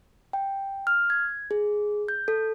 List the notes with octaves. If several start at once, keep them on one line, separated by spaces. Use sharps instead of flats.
G5
F6
G#6
G#4
G6
A4